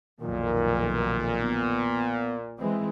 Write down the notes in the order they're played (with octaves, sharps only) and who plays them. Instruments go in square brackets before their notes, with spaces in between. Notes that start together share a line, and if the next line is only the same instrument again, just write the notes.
[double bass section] B1 F2 D#3 [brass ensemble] A#2 [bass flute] A#4
[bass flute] B3
[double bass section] E3 G#3 C4